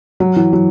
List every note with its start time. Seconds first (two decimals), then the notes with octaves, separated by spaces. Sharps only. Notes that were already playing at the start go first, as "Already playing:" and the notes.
0.20 F#3
0.36 E3
0.53 F#3